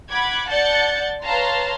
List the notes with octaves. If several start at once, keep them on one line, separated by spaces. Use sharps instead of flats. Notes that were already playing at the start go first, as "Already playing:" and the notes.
F#5 B5 D6 G#6
D5 F#5 A5 G6 A6 C#7
B4 C#5 F5 A5 A#5 C6